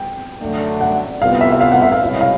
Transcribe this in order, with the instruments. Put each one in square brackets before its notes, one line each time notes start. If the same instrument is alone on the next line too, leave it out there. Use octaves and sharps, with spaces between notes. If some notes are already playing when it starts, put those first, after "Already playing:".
Already playing: [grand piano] G5
[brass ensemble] F#2 D3 F#3 A3 D4
[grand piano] F#5
[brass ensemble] C2 A#2 G3 B3 [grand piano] F5
[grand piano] E5
E5
F5
F#5
E5
F5
[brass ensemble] C2 B2 G#3 C#4 E4
[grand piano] F5